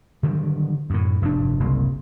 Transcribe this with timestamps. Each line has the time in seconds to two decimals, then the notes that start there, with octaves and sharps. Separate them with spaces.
0.23 D3 D#3 F#3 G3
0.90 F#2 A2
1.22 F1 G2 C3 D4
1.60 F#1 C2